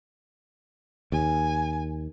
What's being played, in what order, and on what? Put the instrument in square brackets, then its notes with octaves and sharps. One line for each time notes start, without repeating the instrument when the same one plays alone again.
[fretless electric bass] D#2 [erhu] G#5